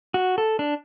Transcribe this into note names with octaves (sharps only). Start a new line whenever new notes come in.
F#4
A4
D4